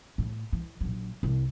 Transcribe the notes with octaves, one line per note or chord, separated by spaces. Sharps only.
A2
E3
A#1 F#3
C2